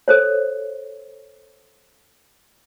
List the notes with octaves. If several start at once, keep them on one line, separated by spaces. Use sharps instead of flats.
A4 C5 C#5